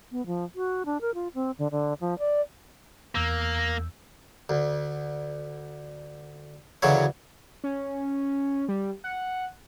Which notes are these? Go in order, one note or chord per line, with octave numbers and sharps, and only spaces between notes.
B3
F3
F#4
D4
A#4
F4
C4
D3
D3
F3
D5
E2 A#3 E6 G6
D2
D2 C#3 E3 F#3 C#5
C#4
G3
F#5